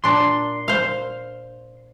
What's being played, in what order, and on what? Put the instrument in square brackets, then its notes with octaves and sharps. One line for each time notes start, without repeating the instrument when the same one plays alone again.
[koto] A#2 D4 [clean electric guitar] C6
[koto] C5 F5